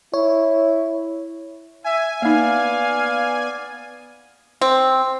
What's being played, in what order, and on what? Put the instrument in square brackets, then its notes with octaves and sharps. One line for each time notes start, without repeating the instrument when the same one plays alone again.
[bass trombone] E4 [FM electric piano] C#5
[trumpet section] E5 [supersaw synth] G#5
[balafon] A#3 D#4 [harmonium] B3 D5 [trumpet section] F5
[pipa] C4